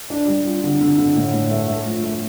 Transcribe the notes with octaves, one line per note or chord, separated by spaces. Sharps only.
D4
G3
F4
D3
D3
D3
A2
A2
A3
A3
F3
A3